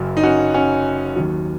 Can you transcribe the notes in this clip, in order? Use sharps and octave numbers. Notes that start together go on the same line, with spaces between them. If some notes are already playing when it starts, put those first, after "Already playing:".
Already playing: F#1 F#2 F#3
D#4
C#4 F#4
C#4 F#4
D#2 D#3 F#3